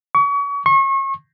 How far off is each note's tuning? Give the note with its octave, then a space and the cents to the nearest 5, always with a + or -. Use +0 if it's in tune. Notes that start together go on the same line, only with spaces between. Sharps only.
C#6 +35
C#6 -35